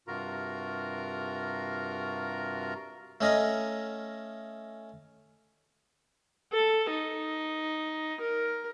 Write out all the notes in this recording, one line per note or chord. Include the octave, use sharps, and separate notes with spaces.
G2 C3 F4 F#4 A#4 A#5
A3 C#4 D#5 F5 A#5
A4
D#4
A#4